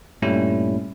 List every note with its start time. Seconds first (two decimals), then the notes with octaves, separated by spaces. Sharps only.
0.22 G2 A#2 G3 A3 C#4 E4